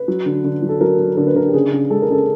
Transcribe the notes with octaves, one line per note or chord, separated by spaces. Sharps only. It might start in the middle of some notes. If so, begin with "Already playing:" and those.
Already playing: B4
F#3
D3
D3
F#3
A4
F#3 A#4
F#3
D3 A#4
B4
D3 A#4
G4
C#3 G#4
C#3
G#3 A4
A#4
C#3 A4